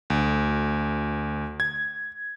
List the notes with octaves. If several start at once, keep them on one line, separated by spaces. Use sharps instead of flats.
D2
G#6